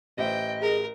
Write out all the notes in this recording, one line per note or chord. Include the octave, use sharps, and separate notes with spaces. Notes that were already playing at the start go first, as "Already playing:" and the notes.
A1 C5 D#5 E5 G5
G#4 A#4